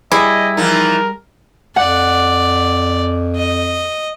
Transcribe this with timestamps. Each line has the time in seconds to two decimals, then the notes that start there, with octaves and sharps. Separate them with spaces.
0.12 G3 E4 G#4 D#5
0.57 E3 F3 D#4 A#4
1.76 F2 D5 F#5
3.36 D#5